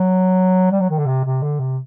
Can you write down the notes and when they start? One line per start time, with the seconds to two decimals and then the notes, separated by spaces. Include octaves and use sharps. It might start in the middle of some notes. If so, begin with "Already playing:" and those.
Already playing: F#3
0.71 G3
0.81 F#3
0.90 D#3
0.98 D3
1.07 C3
1.25 C3
1.43 D3
1.60 C3